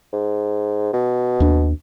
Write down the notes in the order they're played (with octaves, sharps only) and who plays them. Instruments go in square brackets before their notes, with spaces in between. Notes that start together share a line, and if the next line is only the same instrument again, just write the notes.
[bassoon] G#2
B2
[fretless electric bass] D#2 D4